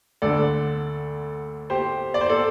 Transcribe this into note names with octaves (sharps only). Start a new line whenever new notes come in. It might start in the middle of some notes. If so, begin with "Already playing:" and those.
D2 D3 A4 D5
G4 C5
D5
C5
A4 D5